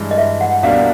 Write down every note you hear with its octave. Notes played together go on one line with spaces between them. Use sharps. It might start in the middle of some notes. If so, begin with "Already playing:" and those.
Already playing: G2 E3 G#3
D#5
E5
F#5
C2 B2 G3 A#3 D4 F5